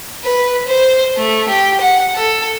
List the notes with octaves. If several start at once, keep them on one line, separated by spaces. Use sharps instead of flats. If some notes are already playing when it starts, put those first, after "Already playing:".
B4
C5
A3
G4
F#5
A4